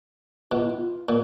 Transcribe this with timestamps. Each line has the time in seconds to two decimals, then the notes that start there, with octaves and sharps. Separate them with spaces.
0.51 B2 F4
0.62 E4
0.73 F4
1.09 A#2